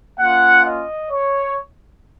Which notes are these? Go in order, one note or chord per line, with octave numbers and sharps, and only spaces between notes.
A#3 C#4 F4 F#5
D#5
C#5